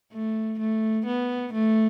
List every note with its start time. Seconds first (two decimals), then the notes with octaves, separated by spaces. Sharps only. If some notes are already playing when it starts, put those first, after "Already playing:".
0.12 A3
0.59 A3
1.06 B3
1.53 A3